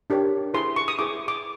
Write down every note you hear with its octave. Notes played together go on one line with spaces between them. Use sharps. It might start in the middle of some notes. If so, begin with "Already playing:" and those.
D4 G4 A#4 C#5
E4 G#4 B4 C6
C#6
D#6
E4 G#4 B4 D6
D6